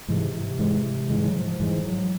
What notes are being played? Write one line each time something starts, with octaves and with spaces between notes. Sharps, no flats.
G#2 C3 E3 G#3
C3
G#2 E3 G#3
G#2 C#3 E3 G#3
F#3
F3
F3
G#2 E3 F3 G#3
F#3